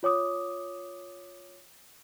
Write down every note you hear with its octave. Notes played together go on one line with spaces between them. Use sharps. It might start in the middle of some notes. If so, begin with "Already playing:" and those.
F4 C#5 D6 D#6